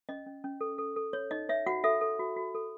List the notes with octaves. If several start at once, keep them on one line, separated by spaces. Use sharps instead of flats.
C#4 D#5
C#4
C#4
A4
A4
A4
C#5
D#4 D#5
C#5 E5
F#4 F#5
A4 E5
A4
F#4
F#4
A4